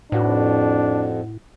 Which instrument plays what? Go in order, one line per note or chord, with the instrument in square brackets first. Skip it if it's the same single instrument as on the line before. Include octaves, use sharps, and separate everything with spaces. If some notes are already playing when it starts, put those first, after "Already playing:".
[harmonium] F2 [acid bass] A2 [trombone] D4 [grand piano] D#4 F#4 B4